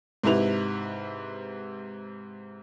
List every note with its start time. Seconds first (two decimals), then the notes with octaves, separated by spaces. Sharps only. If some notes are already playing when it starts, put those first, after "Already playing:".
0.23 G#2 C3 E4 B4 F7